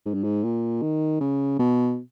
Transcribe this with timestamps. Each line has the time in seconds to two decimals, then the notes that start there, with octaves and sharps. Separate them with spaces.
0.06 G#2
0.14 G2
0.24 G#2
0.44 A#2
0.82 D#3
1.21 C#3
1.59 B2